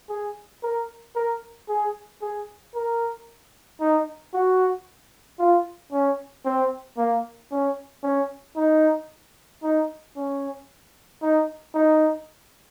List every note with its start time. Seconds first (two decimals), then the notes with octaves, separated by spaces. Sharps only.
0.09 G#4
0.63 A#4
1.16 A#4
1.69 G#4
2.22 G#4
2.75 A#4
3.81 D#4
4.34 F#4
5.39 F4
5.92 C#4
6.45 C4
6.97 A#3
7.51 C#4
8.03 C#4
8.57 D#4
9.63 D#4
10.16 C#4
11.22 D#4
11.75 D#4